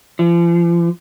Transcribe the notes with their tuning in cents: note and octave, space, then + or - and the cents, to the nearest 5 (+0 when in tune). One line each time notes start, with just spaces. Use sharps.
F3 -40